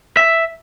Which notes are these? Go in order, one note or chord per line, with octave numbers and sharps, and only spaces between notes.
E5